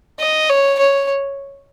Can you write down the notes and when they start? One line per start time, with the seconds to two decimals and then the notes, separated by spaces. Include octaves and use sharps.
0.20 D#5
0.49 C#5
0.79 C#5